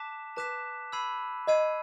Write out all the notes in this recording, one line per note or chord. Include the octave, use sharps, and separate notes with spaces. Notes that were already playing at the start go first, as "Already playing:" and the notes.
Already playing: A5 D6 F#6 B6 E7
B4 A5 D6 F#6 B6 E7
B5 E6 G#6 C7 D#7
D#5 B5 E6 G#6 C7 D#7